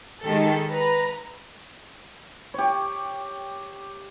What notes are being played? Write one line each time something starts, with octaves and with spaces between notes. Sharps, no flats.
D#3 G#3 G4 A4
B4 A#5
G4 C#5